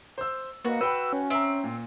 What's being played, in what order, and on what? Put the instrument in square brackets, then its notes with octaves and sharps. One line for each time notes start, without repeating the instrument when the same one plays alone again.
[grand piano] C5 E6
[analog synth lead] A#3 [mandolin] F#4 [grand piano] B4 D#5
[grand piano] B4 G5 B5 [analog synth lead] E6
[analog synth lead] C#4
[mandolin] C4 [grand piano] E5 A#5
[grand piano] A#2